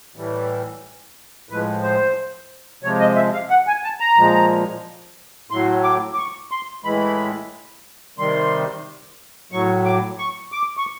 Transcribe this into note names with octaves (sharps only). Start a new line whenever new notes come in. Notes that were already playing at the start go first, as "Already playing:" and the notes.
A2 E3 G3
A2 F3 G#3 B4
C5
C3 F3 G#3 C#5
D#5
E5
F5
F#5
G#5
A5
A#5
A#2 F3 G#3
A2 F#3 C6
D6
D6
C#6
C6
A2 E3 G#3 B5
C3 D#3 G3 C6
A2 F#3 C#6
D6
C#6
D6
C#6